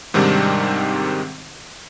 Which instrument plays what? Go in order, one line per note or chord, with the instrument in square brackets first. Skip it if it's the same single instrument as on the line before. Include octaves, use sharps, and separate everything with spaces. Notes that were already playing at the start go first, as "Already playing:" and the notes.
[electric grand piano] G#2 C3 D#3 G3 C4 D4